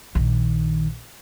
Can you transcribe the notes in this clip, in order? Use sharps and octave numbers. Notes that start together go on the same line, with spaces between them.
A#1 D#3